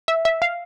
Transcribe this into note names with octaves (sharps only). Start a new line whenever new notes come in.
E5
E5
F5